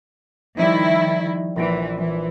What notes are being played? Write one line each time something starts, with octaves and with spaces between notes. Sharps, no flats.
D#3 F3 G3 E4
A#1 E3 A#6 D7
E3